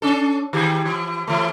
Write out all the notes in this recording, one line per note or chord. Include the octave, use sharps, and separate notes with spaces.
C#4 D4 A4
D#3 G4 G#4
E3
E3 A3